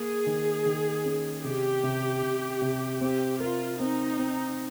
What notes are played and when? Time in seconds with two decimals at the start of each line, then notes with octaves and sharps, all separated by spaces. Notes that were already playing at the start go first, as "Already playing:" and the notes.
Already playing: A#3 G#4
0.27 D#3
0.66 D#3
1.05 C#4
1.44 C3 G4
1.84 C3
2.23 C3
2.62 C3
3.01 C4 G4
3.40 F4 A#4
3.79 C4 D#4
4.19 C4